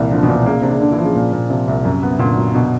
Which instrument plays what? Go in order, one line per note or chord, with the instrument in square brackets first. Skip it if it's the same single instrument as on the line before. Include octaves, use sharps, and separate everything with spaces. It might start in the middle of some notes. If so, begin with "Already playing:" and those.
Already playing: [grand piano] C2 A#2 E3
[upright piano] D3 [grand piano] F3
[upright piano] B2
[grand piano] A#2
[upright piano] B2
[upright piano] C#3 [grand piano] A#3
[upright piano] C3 [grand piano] D4
[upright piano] C#3
[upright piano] D3 [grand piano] D4
[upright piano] E3
[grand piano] F3
[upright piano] C#3
[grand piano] A#2
A#2
[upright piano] C3 [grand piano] F3
[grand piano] C2
F#2
B3
[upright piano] A#2 [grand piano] D3
[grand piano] F#3
[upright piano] B2